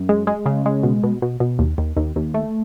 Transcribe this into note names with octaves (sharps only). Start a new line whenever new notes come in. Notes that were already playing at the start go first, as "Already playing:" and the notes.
Already playing: F#2
G#3
G#3
C#3
G#3
B2
B2
B2
B2
D#2
D#2
D#2
D#2
A3